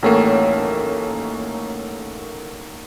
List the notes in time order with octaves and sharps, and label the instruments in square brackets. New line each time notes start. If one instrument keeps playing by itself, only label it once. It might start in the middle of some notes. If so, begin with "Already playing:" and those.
[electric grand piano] A1 A3 A#3 [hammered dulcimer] D#3 F#3 C#4